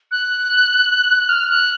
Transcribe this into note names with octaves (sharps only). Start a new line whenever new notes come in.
F#6
F6
F#6